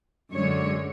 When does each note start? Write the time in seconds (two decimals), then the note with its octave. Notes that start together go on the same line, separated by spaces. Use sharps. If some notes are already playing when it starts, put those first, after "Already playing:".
0.33 F#2 D3 G#3 C#5